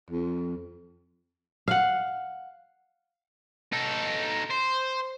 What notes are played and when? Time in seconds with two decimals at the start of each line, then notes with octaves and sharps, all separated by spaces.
0.10 F2
1.68 F5 F#5
3.73 D#4 A4
4.50 C5